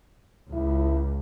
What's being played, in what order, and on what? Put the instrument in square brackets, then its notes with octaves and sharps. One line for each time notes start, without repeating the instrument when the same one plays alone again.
[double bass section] C#2 [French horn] E4